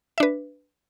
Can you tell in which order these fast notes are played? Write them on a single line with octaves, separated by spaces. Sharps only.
E5 D4 B4